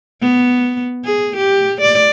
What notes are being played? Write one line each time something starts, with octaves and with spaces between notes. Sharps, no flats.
B3
G#4
G4
D5